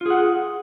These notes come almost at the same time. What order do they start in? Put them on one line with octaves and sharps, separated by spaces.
F4 G#4 F#5